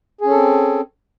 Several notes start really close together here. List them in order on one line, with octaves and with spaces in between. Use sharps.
G#4 C#4 A4 C4